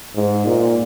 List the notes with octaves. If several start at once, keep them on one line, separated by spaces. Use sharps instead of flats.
G#2
A#2